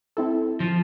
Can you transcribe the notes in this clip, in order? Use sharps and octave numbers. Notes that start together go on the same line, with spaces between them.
C4 E4 A4
F3